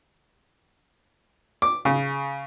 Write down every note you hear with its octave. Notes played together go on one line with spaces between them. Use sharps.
D6
C#3